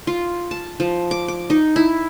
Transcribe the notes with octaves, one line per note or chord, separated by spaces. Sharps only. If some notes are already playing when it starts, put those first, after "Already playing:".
F4
A5
F3
D6
D6
D#4
E4